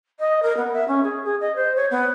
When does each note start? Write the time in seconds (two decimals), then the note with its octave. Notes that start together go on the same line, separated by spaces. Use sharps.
0.19 D#5
0.42 A#4
0.57 B3
0.73 E5
0.87 C#4
1.03 G#4
1.23 G#4
1.40 D#5
1.55 C5
1.76 C#5
1.90 B3